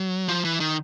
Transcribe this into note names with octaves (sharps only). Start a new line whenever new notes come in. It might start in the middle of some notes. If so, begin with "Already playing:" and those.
Already playing: F#3
F3
E3
D#3